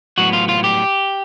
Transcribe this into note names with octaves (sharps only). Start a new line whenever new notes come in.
A2 F#3 B3 F#4
F4
F4
G4